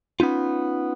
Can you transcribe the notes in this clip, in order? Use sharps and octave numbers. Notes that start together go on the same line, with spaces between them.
B3 C#4 D#4 F4